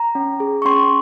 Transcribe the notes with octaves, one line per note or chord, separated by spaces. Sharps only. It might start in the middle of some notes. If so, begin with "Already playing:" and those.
Already playing: A#5
C#4
G#4
C#6
C#4 C6